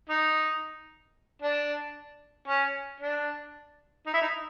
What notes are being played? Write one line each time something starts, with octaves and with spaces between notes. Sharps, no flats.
D#4
D4
C#4
D4
D#4
E4
D#4